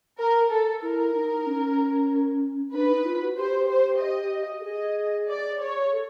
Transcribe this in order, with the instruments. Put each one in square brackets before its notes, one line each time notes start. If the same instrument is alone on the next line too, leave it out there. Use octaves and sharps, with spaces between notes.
[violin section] A#4
A4
[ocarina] E4 [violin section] A#4
[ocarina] D#4
C#4
[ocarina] D4 [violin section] B4
[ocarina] D#4
F4
F#4
[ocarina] G4 [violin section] C5
[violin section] C5
D#5
[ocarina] A4
[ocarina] G#4 [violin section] D#5
[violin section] D5
C#5
[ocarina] A4